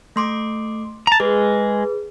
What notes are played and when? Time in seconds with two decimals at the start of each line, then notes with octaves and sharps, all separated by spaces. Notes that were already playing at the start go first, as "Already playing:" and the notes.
0.16 A3 C6 D6
1.07 A5 A#5
1.20 G#3 G#4 B4